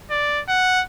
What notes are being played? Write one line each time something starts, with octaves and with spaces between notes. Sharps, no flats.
D5
F#5